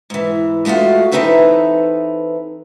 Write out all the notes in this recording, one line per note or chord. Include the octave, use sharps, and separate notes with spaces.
G#2 E3
G#3 A3 B3 F4 F#4
E3 C4 D#4 A4 B4 E5